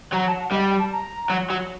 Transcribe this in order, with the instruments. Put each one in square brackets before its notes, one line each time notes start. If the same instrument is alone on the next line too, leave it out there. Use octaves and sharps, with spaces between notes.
[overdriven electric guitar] F#3 [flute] A#5
[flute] A5
F#5
[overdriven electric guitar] G3 [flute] D#5
[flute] G5
A5
A#5
[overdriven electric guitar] F#3
F#3